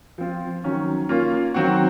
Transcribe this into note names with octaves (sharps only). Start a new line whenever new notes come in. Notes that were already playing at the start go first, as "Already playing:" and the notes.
F3 C4 F4
D#3 F#3 C#4
A#3 C#4 F4
D#3 F#3 C4 F#4